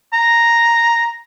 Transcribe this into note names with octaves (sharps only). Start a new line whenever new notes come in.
A#5